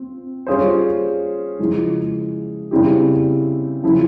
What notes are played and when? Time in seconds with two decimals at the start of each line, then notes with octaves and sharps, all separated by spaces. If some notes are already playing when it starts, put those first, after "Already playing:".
Already playing: C4 F4
0.47 G3 C#4 F4 G#4 C5
1.59 C#3 F3 G#3 E4 G#4
2.71 C#3 G3 C4 E4 G4
3.83 C#3 F3 C4 E4